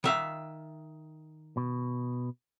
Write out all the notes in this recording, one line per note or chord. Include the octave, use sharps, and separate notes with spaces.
D#3 E5 F5
B2